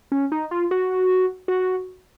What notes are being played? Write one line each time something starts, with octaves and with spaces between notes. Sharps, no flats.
C#4
D#4
F4
F#4
F#4